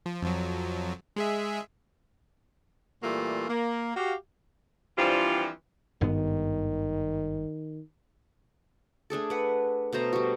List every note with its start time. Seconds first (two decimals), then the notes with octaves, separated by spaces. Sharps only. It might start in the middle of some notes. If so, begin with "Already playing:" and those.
0.06 F3
0.22 F2 F3 F#3
1.16 G#3 G#4 E5
3.03 A#2 E3 G3 A3 A#3 F4
3.49 A#3
3.96 F#4 G4 F5
4.97 E3 F3 G3 C4 D4 F4
6.01 G#1 G2 D#3 B3
9.10 A3 D4 G#4 A4
9.30 B4 F#5
9.93 B2 A3 C5 A#5
10.13 G3 F#4